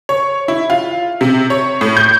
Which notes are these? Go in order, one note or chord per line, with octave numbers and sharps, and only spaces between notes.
C#5
E4
F4
C3
C#5
A2
G6